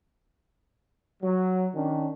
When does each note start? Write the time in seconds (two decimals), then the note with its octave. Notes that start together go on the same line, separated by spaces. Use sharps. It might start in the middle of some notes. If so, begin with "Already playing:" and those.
1.23 F#3
1.75 D#3 C#4 D4